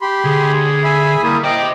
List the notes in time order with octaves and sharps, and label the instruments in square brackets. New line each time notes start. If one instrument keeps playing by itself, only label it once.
[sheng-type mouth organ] G4 B5 C6
[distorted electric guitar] D2 [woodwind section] G#4
[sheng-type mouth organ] E5 G#5 B5
[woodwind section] G3 [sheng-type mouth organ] A#3 E4 D#6
[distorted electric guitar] C5 E5 [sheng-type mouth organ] D#5 [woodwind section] G5 D6